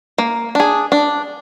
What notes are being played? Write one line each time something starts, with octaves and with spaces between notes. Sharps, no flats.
A#3
D4 G#4
D4